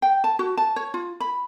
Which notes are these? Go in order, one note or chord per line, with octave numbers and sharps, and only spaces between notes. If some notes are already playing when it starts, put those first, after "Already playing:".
G5
A5
F#4
A5
C#5
F4
B5